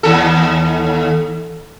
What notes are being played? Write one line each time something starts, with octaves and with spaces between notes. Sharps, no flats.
D#2 A4